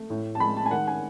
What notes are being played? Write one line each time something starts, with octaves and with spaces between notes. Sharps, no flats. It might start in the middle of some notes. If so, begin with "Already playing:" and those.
Already playing: A3
A2
A5
G#3 B5
A5
G#5
D#3 F#5
G#5